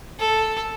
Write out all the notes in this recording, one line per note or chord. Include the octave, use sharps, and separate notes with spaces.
A4